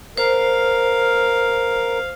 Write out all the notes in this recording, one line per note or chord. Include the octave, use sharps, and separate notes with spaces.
A#4 C5 F5